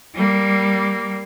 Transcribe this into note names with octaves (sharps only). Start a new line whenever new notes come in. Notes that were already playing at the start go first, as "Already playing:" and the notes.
G3 A#3